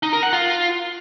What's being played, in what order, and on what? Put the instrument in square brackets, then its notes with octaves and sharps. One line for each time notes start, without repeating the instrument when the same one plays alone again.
[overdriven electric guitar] D#4
A#4
F#5
F4